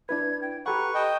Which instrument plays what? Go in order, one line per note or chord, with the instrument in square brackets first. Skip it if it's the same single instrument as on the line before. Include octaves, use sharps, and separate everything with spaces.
[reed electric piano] D4 E4 B4 [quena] G#6
[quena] G5
[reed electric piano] G4 A4 F#5 [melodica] B4 C#6 [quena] A#5
[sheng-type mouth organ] D#5 G5 [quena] A5